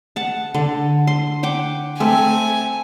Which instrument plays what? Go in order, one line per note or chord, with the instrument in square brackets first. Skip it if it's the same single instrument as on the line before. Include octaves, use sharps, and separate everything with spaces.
[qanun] F#5 A5
D3
C6
F#5 G5 D6
[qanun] A3 C4 [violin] G#5